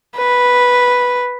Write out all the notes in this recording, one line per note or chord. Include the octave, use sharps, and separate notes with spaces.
B4